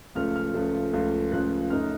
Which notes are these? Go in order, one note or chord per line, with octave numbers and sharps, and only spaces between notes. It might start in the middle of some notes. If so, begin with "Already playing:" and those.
C#2 C#3 F3 A3 F6
F6
C#2 C#3 F3 A3
C#2 C#3 F3 A3
C#2 C#3 F3 A3 F#6
F#2 C#3 A3 D#4 F6